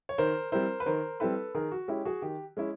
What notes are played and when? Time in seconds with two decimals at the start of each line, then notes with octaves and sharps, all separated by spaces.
0.09 C#5
0.18 D#3 A#4 C5
0.52 G3 C4 E4 A#4 C5
0.80 B4
0.86 D#3 A#4 C5
1.20 G3 C4 E4 A4 B4
1.55 D#3 G#4 A#4
1.72 F#4
1.88 G#3 C#4 E4 G4
2.05 F#4 G#4
2.22 D#3 G4
2.57 G#3 C#4 E4